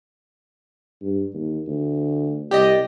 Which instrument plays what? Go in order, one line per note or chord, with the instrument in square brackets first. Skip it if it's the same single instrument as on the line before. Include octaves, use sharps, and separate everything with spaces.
[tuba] G2
D#2
D2
[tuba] C2 [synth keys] G4 D5 D#5